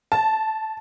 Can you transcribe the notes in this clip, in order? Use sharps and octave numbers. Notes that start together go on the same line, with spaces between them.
A5